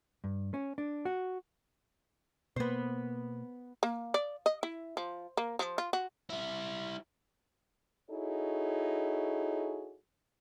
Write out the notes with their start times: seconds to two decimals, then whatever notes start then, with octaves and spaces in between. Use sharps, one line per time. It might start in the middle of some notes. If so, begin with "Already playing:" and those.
0.24 G2
0.54 C#4
0.78 D4
1.05 F#4
2.56 B2 A#3 B3 C5
3.83 A#3
4.14 D5
4.46 D#5
4.63 E4
4.97 F3
5.37 A#3
5.59 F3
5.78 F4
5.93 F#4
6.30 G3 E4
8.10 D#4 E4 F#4 G#4 A4 C#5